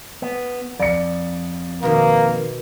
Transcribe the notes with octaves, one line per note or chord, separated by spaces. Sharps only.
B3
F2 D5 C#7
B2 D#3 A#3